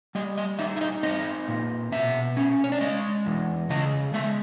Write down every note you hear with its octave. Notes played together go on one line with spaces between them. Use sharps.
G3 D#5
D#5
D#4 E5
E5
D#5
C4 D#5
A#2
B2 E5
C#4
C#5
D5
G#3 D#5
E2
C#3 D#5
G#3 E5